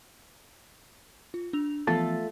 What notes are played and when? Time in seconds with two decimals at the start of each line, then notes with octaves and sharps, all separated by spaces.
1.34 F4
1.53 D4 E6 F7
1.87 E3 F3 A3 B3 F4 A4